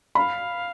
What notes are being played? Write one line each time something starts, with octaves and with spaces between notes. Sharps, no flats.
F5 B5